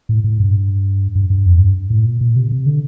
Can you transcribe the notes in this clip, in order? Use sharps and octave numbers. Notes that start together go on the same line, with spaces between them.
A2
A2
G2
G2
G2
F2
G2
A2
A#2
A#2
C3
C3
D3